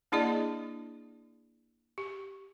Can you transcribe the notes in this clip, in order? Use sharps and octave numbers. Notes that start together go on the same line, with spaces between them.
A#3 D4 E4 G#4 D5 D#5
G4